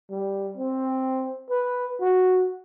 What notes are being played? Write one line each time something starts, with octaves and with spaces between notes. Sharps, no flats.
G3
C4
B4
F#4